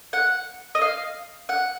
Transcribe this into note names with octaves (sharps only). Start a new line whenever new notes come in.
F#5
D#5
F5
F#5